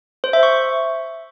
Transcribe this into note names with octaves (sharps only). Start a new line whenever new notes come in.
C5
E5
C#6